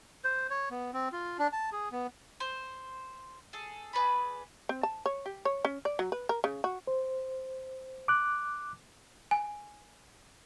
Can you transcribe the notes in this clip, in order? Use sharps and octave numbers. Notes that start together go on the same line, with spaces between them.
C5
C#5
B3
C4
F4
D4
A5
G#4
B3
C5
G#4 A4
G#4 B4 D5 B5
C4
A5
C#5
G4
C#5
C#4
D5
F#3
B4
A#4
C#3
F#4
C5
D6 F#6
G#5